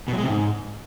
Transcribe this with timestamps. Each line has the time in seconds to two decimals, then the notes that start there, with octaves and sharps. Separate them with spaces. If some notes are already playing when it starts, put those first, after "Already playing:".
0.08 B2
0.13 F#3
0.18 G#3
0.23 C3
0.28 G#2